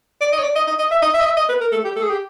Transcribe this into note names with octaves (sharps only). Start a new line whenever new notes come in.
D5
D#5
C#5
D5
D#5
D#5
D#5
E5
D#5
E5
D#5
E5
D#5
B4
A#4
A4
G4
A4
G#4
G4